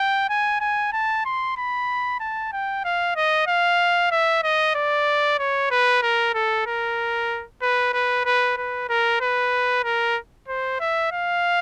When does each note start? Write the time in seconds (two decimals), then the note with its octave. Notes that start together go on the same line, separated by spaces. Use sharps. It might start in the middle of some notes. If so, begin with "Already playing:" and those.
Already playing: G5
0.29 G#5
0.61 G#5
0.93 A5
1.25 C6
1.57 B5
2.20 A5
2.53 G5
2.84 F5
3.16 D#5
3.47 F5
4.11 E5
4.43 D#5
4.75 D5
5.39 C#5
5.71 B4
6.02 A#4
6.34 A4
6.66 A#4
7.62 B4
7.93 B4
8.25 B4
8.57 B4
8.89 A#4
9.21 B4
9.84 A#4
10.48 C5
10.80 E5
11.12 F5